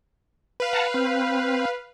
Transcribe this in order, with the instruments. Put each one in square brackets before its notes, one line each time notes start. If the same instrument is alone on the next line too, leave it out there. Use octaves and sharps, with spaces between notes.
[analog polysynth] B4 F5
[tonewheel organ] F#5 A5 A#5
C4